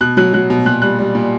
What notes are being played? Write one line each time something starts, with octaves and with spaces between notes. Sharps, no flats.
B2 F#6
F#3 F#6
F#3 F#6
B2
A#2 F#6
G3 F#6
G3
A#2